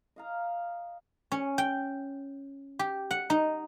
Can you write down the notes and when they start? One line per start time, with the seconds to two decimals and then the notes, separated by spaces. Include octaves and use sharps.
0.16 D#5 F5 A#5
1.32 C#4
1.58 G5
2.79 G4
3.11 F#5
3.30 D#4